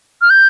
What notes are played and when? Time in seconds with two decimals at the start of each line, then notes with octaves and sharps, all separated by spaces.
0.21 F6
0.30 G6